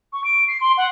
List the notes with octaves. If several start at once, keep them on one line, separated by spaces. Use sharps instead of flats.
C#6
D7
C7
C6
F#5